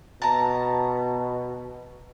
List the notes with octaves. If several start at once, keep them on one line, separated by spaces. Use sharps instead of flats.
B2 A5 A#5